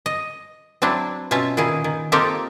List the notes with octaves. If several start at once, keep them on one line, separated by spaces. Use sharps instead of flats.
D#5
F#3 C4 D4 E4
B2 C#4 F4 E5 A5
A#2 D#3 E4 G#4
D#3
A#3 C4 D#4 F4 G4 A4